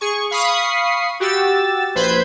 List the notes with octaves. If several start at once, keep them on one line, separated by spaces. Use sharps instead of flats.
G#4 C#6
F5 B5 C#6 D#6 C7
F#4 G4 E6 A6
A#1 B4 C5 B5 G6 G#6